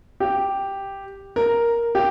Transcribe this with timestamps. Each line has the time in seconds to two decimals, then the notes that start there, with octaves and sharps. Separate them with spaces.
0.20 G4
1.36 A#4
1.95 G4